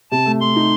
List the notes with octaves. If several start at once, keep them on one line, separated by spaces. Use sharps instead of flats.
C3 A5
A3
A3 C6
D#4